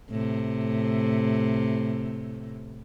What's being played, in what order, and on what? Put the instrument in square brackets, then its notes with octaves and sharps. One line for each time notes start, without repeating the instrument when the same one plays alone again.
[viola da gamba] A2 C3